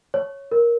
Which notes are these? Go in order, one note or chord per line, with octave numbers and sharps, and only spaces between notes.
C#5
A#4